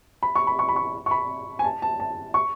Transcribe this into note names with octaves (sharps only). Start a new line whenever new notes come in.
B5
C#6
B5
C#6
B5
C#6
C#6
B5
G#5
A5
A5
A5
C#6